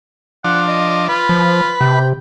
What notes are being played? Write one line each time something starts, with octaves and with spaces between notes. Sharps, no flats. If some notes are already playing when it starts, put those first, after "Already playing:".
F3 D4 F#5
D#5
F4 B4
F3
C3 G5